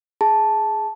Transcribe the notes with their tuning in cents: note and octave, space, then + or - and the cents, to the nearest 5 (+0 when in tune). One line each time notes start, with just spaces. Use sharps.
G#4 +0 A5 -5